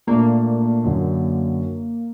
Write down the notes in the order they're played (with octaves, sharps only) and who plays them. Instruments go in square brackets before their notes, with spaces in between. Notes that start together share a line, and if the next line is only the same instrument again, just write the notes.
[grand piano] A#2 A3 D4 [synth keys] A#3
[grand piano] F#2 D3 F#3